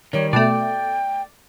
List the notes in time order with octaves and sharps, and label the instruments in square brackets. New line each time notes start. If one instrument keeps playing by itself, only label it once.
[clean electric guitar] D#3 G3 [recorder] C#5
[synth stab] B2 A3 [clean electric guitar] D5 [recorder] G5